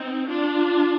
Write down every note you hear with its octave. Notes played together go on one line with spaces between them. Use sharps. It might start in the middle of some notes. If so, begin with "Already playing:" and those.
Already playing: C4 D#4
D4 F4